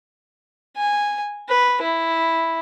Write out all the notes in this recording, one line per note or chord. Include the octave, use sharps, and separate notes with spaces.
G#5
B4
E4